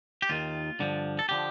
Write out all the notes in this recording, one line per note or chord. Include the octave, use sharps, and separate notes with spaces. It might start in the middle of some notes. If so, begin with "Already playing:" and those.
G4
D#2 D#3 F4
G2 D3 F3
A4
D3 F3 G4